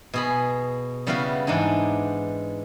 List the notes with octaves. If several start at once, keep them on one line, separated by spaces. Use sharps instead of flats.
B2 G#4 B5
C#3 G3 B3 E4 F#4 F5
G#2 E3 D4 D#4